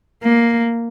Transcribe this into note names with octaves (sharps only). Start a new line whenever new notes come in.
A#3